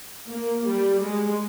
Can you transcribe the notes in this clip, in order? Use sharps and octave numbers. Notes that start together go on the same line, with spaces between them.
A#3
G3
G#3